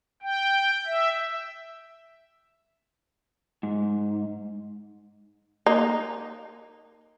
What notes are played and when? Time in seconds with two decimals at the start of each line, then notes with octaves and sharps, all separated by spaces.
0.22 G5
0.86 E5
3.63 G#2
5.66 A#3 D#4